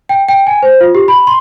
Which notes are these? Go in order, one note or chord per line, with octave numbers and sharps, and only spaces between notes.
G5
G5
G#5
C5
F4
G4
B5
C6